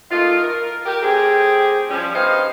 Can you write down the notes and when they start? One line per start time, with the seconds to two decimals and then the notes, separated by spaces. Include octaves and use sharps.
0.11 A3 A#3 D#4 F4
0.44 A#4
0.86 G4 A#4
1.02 A2 C4 G4 G#4
1.90 F3 G3 C#4
2.14 G2 B3 D#4 G4 C5 F5